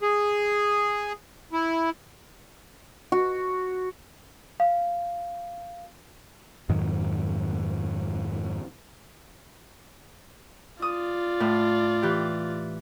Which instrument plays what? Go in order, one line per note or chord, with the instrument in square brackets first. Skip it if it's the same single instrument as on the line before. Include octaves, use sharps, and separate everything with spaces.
[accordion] G#4
E4
[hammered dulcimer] F#4
[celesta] F5
[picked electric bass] F2 G#2 D#3 F#3
[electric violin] F4 D5 [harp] D#6
[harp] A2
E3 G4